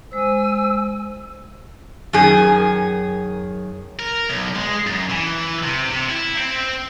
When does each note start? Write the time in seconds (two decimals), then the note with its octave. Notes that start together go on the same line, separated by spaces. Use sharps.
0.12 G#3 C5 G#5 E6
2.13 F#2 D#3 G#4
3.99 A#4
4.30 B1
4.56 G#3
4.87 F#2
5.10 E3
5.63 C3
5.90 C3
6.09 E4
6.38 C4